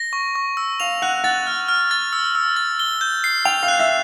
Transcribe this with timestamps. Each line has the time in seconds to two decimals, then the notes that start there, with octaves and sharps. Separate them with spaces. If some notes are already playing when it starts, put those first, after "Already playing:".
Already playing: A#6
0.13 C#6
0.35 C#6
0.57 E6
0.80 F5 F7
1.02 F#5 F#6
1.24 F#5 A6
1.47 F6
1.68 F6
1.91 A6
2.13 E6
2.35 E6
2.56 A6
2.79 G7
3.01 G6
3.24 C7
3.45 G5 F7
3.63 F5
3.68 F#6
3.80 E5